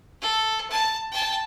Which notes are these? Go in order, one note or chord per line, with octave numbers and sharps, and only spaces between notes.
A4
A5
G5 A5